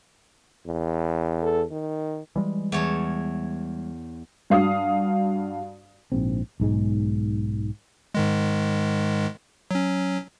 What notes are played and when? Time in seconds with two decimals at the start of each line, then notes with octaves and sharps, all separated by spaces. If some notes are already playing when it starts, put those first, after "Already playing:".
0.66 E2
1.43 A4
1.71 D#3
2.36 E3 G3 G#3
2.72 E2 C#5 A5
4.50 G2 F#4 F5 D#6
6.12 A#1 G#2 C4
6.60 B1 G#2 G#3
8.15 G#2 D#3 G#3
9.71 F#3 C#4